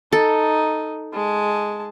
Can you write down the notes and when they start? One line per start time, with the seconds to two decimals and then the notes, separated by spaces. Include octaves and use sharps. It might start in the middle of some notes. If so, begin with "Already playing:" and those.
0.12 D#4 A4
1.13 G#3 A5